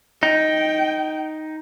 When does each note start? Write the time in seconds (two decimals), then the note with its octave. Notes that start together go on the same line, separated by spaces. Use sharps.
0.23 D#4 G5